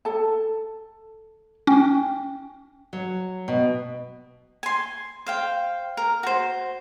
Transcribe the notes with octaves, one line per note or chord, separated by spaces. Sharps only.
A4 A5
C#4 G5
F#3
B2
G#5 C6
C5 F5 G5
A#4
F#4 C5